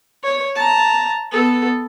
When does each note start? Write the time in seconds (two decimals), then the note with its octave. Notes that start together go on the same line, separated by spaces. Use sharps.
0.23 C#5
0.56 A5 A#5
1.32 B3 A4